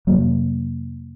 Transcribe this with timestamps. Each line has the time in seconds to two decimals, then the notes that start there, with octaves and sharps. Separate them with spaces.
0.07 F2 C3 F#3 A#3